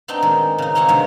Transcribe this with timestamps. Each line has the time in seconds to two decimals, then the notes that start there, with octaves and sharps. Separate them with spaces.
0.08 B3 C4 D4 D#4 D#5 G5
0.23 D#3 G#3
0.58 C#3 D#4
0.75 A#3 C4 F#4 C#5 F#5
0.88 G2 C3 D#3 G#3 C#5